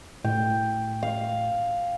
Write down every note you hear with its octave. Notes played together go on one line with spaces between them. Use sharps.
A2 G5
F5